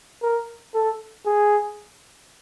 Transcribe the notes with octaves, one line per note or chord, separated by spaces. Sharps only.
A#4
A4
G#4